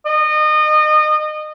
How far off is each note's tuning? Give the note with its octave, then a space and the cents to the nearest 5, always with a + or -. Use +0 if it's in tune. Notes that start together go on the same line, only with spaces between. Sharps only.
D#5 -30